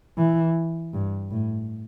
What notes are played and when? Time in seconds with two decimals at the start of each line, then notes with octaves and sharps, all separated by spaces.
0.18 E3
0.94 G2
1.31 A2